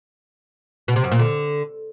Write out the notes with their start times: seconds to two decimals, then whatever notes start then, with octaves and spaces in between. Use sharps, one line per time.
0.88 B2
0.96 C3
1.04 F#2
1.12 A#2
1.19 D3